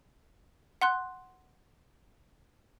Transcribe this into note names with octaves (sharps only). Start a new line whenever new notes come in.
F#5 C6 F#6